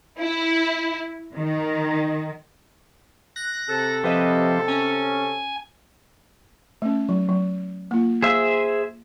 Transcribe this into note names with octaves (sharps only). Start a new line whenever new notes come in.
E4
D#3
F#6 A#6
C3 A4
F3 C4 G4 B4 D#5 E5
C#4 G#5
A3 C#4
F#3
F#3
A#3 F4
G#4 C5 E5 F5